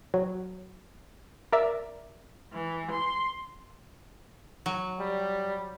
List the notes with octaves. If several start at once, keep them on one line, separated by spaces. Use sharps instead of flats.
F#3
A#4 D5 E5
E3
C6
F#3
G3